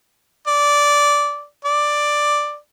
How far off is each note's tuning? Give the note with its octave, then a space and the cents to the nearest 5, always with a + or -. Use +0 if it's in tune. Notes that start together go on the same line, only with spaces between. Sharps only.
D5 -10
D5 +5